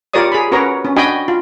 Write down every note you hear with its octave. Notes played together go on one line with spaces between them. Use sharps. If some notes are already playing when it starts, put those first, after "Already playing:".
F4 G4 A#4 C#5 D5 D#6
G#4 B5
C#4 F#4 A#4 B4 C#5 A#5
C#4
D4 F#4 D#5 G5 G#5 B5
F4